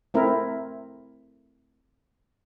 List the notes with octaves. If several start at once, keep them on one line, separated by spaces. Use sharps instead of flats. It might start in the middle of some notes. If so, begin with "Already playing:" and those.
A3 C4 E4 A#4